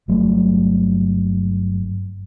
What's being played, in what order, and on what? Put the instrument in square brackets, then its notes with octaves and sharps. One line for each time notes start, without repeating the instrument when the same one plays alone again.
[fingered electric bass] G1 G2 F#3 A3